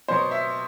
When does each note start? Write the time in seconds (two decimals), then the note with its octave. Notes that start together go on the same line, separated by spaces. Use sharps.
0.08 B2 F#3 B3 C5
0.31 E5